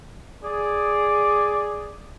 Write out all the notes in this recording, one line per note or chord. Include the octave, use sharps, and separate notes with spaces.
G#4 D5